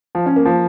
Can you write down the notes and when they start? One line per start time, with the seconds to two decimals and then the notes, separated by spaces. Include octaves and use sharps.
0.15 F3
0.26 C#4
0.36 A#3
0.45 F3